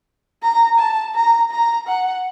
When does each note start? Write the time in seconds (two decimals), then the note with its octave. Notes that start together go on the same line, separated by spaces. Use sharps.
0.43 A#5
0.79 A5
1.15 A#5
1.51 A#5
1.88 F#5